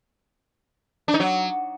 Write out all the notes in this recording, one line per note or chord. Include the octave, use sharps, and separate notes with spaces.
D4
D#4
F#3